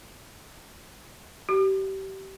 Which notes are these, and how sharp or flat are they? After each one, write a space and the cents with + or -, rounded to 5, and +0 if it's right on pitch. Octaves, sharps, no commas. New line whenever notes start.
G4 -30